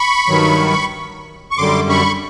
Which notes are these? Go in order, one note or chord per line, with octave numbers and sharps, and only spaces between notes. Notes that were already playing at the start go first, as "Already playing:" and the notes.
Already playing: B5 C#6
G2 D#3 F#3
C#6
F#2 D3 G3 C6 D6
B5 C#6